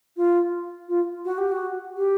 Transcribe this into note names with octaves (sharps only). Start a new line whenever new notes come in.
F4
F4
F#4
G4
F#4
G4